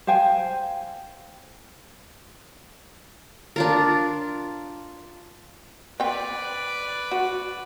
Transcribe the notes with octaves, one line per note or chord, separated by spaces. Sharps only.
C5 F5 G5 G#5
D4 F4 A#4
C4 B4 D5 G5
F#4